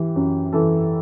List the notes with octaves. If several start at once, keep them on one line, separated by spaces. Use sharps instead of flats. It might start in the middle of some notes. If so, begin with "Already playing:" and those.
Already playing: E3 G4
F#2
E3 A4